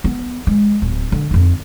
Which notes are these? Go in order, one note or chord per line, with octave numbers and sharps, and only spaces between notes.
B3
G#3
D1
D3
F2 D#4